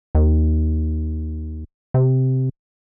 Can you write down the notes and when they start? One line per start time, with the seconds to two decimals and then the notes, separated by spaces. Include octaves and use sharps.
0.15 D#2
1.94 C3